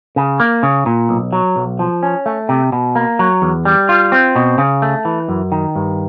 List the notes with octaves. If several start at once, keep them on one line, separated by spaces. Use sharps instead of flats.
C#3
A#3
C#3
A#2
B1
F#3
B1
F3
C#4
A3
C3
B2
A#3
F#3
E2
G3
F4
C4
B2
C#3
A3
E3
F#2
D#3
G2